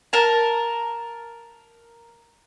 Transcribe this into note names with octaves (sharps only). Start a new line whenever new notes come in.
A#4 A5